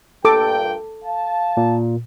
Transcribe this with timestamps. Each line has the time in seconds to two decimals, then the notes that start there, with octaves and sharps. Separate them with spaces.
0.25 G2 A#2 A4 G5 D6
1.04 F5 A5
1.57 A#2